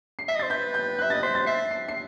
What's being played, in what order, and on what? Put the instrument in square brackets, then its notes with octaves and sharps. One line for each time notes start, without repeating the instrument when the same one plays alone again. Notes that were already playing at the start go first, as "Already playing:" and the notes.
[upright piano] C7
[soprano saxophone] E5 [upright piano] B6
[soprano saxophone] D#5
[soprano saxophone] C5 [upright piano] A6
[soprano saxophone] B4 [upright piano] G6
[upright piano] G6
F#6
[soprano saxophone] E5
[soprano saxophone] D#5 [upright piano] A6
[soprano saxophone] C5 [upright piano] B6
[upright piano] A6
[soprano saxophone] E5 [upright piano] C7
[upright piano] C7
C7